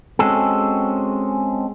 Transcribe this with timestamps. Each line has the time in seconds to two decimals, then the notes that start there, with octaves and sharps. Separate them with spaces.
0.19 G#3 C4 C#4 F#4 G#4 A4